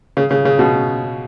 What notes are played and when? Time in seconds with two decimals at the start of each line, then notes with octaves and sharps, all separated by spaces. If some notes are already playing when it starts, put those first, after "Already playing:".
0.17 C#3
0.31 C#3
0.45 C#3
0.59 B2